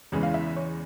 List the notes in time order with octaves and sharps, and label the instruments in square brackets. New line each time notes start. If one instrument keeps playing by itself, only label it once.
[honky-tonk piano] E2 C#3 E3 G#3
F5
E5
C#5